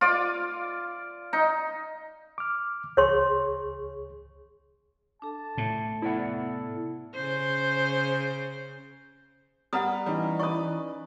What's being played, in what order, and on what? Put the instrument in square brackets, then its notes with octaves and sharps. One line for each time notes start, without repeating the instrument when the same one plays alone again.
[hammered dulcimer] F4 D5
D#4
[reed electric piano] D6 F6
[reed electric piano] C#2 G#4 C#6 [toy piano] C#5 C6
[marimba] D4 A4 [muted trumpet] A5
[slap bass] A2
[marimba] C3 B3 E5 [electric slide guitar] E4 D5 F#5 [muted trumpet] A4
[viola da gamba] C#3 C5
[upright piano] G3 B3 F6 [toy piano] F#5 A#5 D#6
[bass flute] E3 [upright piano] G3 [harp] C#4 D#4
[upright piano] B4 D5 [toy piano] C#6 D#6